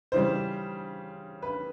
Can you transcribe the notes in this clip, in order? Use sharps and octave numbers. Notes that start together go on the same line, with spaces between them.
C#3 E3 G3 C5
B4